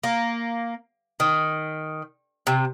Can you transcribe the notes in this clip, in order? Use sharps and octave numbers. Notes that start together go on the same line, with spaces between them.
A#3
D#3
C3